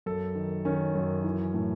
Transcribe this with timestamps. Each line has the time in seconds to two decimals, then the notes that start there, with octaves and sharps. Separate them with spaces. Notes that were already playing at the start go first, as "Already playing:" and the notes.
0.06 F#2 A4
0.35 D#3
0.65 D#3 C#4
0.95 F#2
1.24 E3
1.54 A2